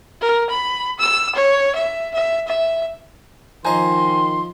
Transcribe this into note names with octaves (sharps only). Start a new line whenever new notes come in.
A#4
B5
E6
C#5
E5
E5
E5
D#3 F3 C5 D#5 G#5 A#5 C6